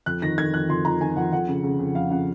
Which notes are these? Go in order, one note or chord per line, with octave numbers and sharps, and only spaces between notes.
F2 F#6
D#3 A#6
D#3 G#6
F2 F#6
F2 C6
D#3 A#5
D#3 G#5
F2 F#5
F2 F#5
C#3
C#3
F2
F2 F5
C#3 F#5